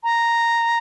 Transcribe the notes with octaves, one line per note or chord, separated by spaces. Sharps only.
A#5